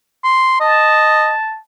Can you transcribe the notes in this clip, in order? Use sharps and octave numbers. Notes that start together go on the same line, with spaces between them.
C6
D#5 A5